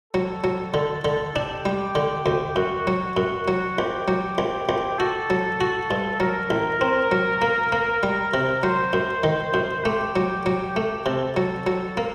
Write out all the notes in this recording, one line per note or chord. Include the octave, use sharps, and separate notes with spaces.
F#3 A4
F#3
D3
D3
D4 G4
G3
D3
D2
F#2 F#4
F#3
F#2
F#3
A#1 G4
F#3
A#1
A#1
F#4 A4
F#3
F#4
G2
F#3 A#4
A1
C4
F#3
A#3
A#3
G3
C3
F#3 C5
F#2
D#3
F#2
A3 G4
F#3
F#3
A3
C3 A4
F#3
F#3
A#3